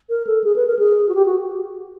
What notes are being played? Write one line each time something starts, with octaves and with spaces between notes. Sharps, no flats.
A#4
A4
G#4
B4
A#4
G#4
F#4
G4
F#4